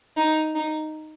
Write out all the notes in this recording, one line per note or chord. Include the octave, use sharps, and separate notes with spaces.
D#4
D#4